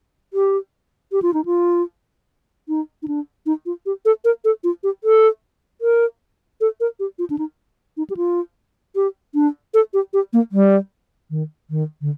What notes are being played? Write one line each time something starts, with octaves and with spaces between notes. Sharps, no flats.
G4
G4
F4
D#4
F4
D#4
D#4
D4
D#4
F4
G4
A4
A#4
A4
F4
G4
A4
A#4
A4
A#4
G4
F4
D4
D#4
D#4
G4
F4
G4
D4
A4
G4
G4
A#3
G3
D#3
D#3
D3